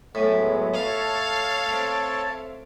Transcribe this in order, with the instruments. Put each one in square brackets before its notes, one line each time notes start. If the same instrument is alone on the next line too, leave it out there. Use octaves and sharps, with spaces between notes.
[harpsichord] A2 [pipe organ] F#3 G#3 B3 [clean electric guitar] E5 G#5
[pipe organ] A4 C#5 A5 [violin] F5
[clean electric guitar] A3 C4